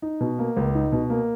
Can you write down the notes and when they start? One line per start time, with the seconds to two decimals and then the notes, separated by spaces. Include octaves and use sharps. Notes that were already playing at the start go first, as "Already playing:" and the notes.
0.02 D#4
0.20 B2
0.39 A#3
0.56 C#2
0.75 D#4
0.92 B2
1.10 A#3